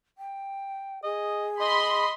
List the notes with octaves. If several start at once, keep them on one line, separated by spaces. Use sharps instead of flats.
G5
G#4 D#5
D#5 B5 C6